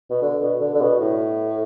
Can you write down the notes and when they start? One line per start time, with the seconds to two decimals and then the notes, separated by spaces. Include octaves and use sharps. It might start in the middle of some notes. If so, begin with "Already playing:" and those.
0.10 B2
0.22 D3
0.42 B2
0.61 D3
0.74 D3
0.80 B2
1.00 A2